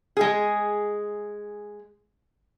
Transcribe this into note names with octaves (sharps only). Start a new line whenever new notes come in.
G#3 G#4